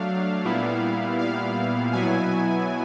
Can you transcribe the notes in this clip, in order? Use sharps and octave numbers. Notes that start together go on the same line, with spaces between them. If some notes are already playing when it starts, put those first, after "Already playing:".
Already playing: F#3 A3 D4 F5
A#2 G3 B3 E4
F5
B2 F#3 B3 E4 G#5